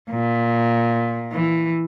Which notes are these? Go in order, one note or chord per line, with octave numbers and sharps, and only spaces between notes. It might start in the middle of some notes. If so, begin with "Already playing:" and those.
A#2
E3